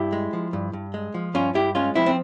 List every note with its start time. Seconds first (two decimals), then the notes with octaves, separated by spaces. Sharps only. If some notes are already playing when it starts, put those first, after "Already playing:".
Already playing: G2 E4 G4
0.13 G#3
0.33 F3
0.53 G2
0.73 G2
0.94 G#3
1.14 F3
1.34 G2 C#4 F4
1.54 G2 E4 G4
1.75 G#3 C#4 F4
1.95 F3 C4 E4
2.06 C4